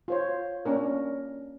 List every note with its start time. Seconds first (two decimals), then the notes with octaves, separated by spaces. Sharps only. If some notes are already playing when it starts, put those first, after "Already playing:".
0.08 F4 C5 C#5
0.65 A#3 C#4 D4 A#4